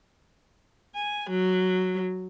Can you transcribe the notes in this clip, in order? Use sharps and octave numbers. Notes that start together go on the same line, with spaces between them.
G#5
F#3